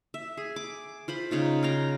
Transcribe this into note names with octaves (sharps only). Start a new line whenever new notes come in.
E5
G#4
D6
F4 C5 B5
C#3 D#4 F4
F5 G5 A#5